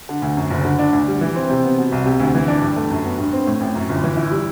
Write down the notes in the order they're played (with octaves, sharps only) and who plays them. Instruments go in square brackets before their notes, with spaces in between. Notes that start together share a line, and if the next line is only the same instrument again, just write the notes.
[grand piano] D3
D2
F#2
F#1
D3
D4
D2
G3
E3
C4
C3
B3
B2
C2
C3
D2
E3
D4
G2
A3
F#2
B3
G2
C4
A2
A1
F#2
G1
E3
E4
G3